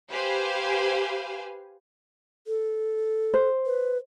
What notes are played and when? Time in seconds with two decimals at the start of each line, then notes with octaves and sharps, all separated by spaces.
0.11 G4 B4 C5 F5 G#5
2.47 A4
3.34 C5
3.66 B4